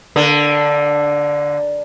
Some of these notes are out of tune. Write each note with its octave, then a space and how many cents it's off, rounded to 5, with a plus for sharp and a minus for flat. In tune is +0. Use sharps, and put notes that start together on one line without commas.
D3 +0 A#3 +30